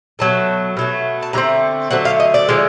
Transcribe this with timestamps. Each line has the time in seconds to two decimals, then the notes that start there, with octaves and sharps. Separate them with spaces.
0.19 B2 F#3 A3 A5
0.77 B2 F#3 A3
1.22 A5
1.33 D3 F#3 A3 C4 A#5
1.91 D3 F#3 A3 C4 F#5
2.05 F5
2.20 D#5
2.34 D5
2.49 D3 F3 G#3